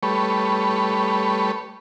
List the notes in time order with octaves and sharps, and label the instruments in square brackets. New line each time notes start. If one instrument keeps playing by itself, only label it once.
[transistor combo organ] G3 A3 B4 C#5